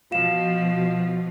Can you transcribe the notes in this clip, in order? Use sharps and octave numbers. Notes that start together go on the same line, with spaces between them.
B2 F3 F4 F5 E7